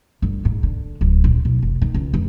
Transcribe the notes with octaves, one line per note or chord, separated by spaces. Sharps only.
G1
G#2
D3
D1
A#1
B1
F1
D#3
C#2
F1